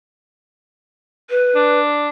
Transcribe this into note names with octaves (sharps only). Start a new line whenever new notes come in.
B4
D4